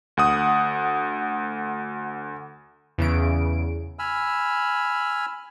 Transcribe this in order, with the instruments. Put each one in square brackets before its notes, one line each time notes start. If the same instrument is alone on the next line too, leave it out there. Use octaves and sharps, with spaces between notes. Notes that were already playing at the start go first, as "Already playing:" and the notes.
[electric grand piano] D2 F#5 D#6
[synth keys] E2 C#3 D7
[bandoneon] G#5 B5 E6 F6